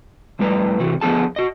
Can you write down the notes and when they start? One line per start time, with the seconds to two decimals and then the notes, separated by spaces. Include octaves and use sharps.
0.39 F2 A2 G3 B4 A#5
0.80 C3 E3 F#4
1.01 D3 F3 B3 G#4 A5
1.36 F#4 D#5